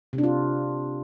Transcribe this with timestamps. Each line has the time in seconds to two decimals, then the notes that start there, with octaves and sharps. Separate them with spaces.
0.13 C3
0.18 D4
0.23 F4